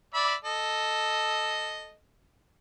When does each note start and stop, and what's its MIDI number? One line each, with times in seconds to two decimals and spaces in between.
0.14 0.34 74
0.14 0.34 76
0.14 0.34 83
0.44 1.95 69
0.44 1.95 75